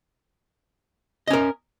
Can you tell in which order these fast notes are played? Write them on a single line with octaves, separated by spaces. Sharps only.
D#5 C#4 A#4